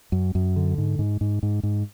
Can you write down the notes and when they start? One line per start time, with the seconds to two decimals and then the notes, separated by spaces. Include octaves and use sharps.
0.12 F#2
0.35 F#2
0.56 D3
0.78 G#2
0.99 G#2
1.21 G#2
1.43 G#2
1.63 G#2